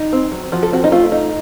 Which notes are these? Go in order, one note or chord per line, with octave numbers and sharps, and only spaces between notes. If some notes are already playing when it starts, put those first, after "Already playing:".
Already playing: D#4
C4
F#3
F3 F#4
A4
C4 F#4
D#4
A3 F4
D#4